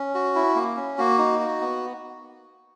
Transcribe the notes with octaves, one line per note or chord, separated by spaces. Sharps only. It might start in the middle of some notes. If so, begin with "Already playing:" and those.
Already playing: C#4
F#4
E4
A#3
C#4
A#3 F#4
D#4
F#4
B3